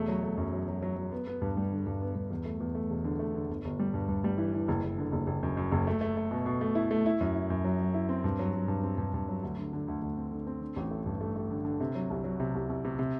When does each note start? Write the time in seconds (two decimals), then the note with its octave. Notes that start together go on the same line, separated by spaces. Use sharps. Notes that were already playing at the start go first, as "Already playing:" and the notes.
Already playing: E1 A3
0.08 F#3
0.23 A3
0.37 F#2
0.53 F#3
0.68 F#3
0.82 F#3
0.97 F#3
1.12 B3
1.27 B3
1.42 G2
1.57 G3
1.72 D3
1.86 G2
2.02 B3
2.15 G2
2.30 E2
2.45 A3
2.60 E2
2.75 A3
2.90 E1
3.04 D3
3.19 A3
3.34 D3
3.49 G1
3.65 G1
3.79 G3
3.94 G2
4.09 G2
4.24 G3
4.38 E3
4.54 E3
4.68 F#1
4.83 F#1
4.98 D3
5.12 F#1
5.27 F#1
5.43 F#2
5.57 F#2
5.72 F#1
5.87 A3
6.01 A3
6.17 A3
6.31 B2
6.46 B2
6.61 A3
6.75 E4
6.91 A3
7.06 E4
7.21 F#2
7.35 E4
7.50 F#2
7.64 F#3
7.80 F#3
7.94 E4
8.09 C4
8.24 G2
8.39 F#3
8.53 F#3
8.68 G2
8.83 C4
8.98 G2
9.14 G2
9.28 F#3
9.43 D2
9.58 D3
9.73 D3
9.88 D2
10.02 D2
10.17 C4
10.32 D3
10.47 C4
10.61 D3
10.76 A1
10.91 A3
11.06 G2
11.20 A3
11.36 A3
11.51 D3
11.65 D3
11.80 C3
11.95 F#3
12.10 C2
12.24 F#3
12.40 C3
12.55 C2
12.69 C2
12.85 C3
12.99 C3